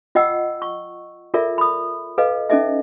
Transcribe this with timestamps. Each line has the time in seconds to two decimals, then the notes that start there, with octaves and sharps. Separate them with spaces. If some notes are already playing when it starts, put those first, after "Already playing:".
0.15 F4 D#5 F#5 G5 E6
0.62 C#6
1.34 F4 A4 A#4 D5 E5
1.58 B5 D#6
2.18 A4 B4 D#5 F5
2.50 C#4 D#4 A4 D#5 E5